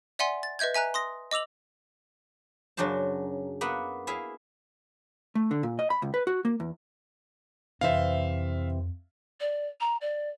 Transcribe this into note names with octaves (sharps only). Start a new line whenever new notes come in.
D5 E5 F#5 G#5 C6
A6
B4 D#5 E5 G6 G#6
E5 G#5 A#5 F#6
C6 D#6 A#6
D#5 D6 E6 F7 F#7
F#2 C#3 F#3 D4 C5 A5
A#3 B3 E5 F#5
E4 G#4 E5 F5
A3
D3
A#2
D#5
B5
C#2
B4
F#4
A#3
E2
F2 C3 E3 C5 E5 F5
D5
A#5
D5